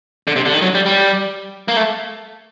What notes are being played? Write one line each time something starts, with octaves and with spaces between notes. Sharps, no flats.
D3
C3
D3
D#3
F#3
G3
G3
A#3
A3